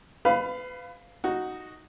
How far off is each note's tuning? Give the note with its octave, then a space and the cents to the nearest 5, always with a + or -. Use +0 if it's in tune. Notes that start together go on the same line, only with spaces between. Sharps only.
B4 +30 F5 +0 B5 +0
D#4 +0 F#4 +0